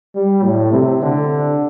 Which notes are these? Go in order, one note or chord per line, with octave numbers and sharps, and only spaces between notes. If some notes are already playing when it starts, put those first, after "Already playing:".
G3
A2
C3
D3